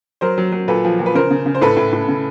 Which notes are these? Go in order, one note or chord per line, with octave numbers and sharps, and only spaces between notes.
F#3 A#4 C5
F#3
F#3
A#2 A4 B4
F3
A#2
B4
C#3 A#4 C5
C#3
C#3
C5
A2 A4 B4
A2
A2
C#3